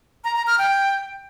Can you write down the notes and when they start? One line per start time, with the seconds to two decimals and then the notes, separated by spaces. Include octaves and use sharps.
0.24 A#5
0.36 A#5
0.47 F6
0.58 G5